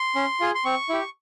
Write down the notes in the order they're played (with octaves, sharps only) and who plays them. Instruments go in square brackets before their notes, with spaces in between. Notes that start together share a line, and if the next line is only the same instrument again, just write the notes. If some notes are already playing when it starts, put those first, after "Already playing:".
Already playing: [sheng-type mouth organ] C6
C#4
F4 G#4
C6
C4 C#6
E4 G4